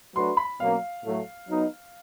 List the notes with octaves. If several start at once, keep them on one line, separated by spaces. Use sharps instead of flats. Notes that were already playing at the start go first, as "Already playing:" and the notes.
F#3 A3 D4 F#4 B4 C6
B5
B2 F#3 A#3 C#4 F5
A2 F#3 A3
F#3 B3 D#4